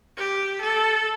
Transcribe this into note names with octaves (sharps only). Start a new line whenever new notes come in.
G4
A4